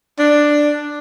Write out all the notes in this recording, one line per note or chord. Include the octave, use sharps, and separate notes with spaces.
D4